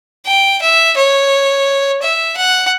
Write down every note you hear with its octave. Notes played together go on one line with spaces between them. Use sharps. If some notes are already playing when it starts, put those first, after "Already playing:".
G5
E5
C#5
E5
F#5